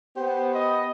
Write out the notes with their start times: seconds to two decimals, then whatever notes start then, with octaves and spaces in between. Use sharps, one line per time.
0.17 B3 G4 C5
0.54 D#5